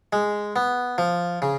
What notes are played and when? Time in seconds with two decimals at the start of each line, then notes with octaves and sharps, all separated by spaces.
0.13 G#3
0.56 B3
0.98 F3
1.42 C#3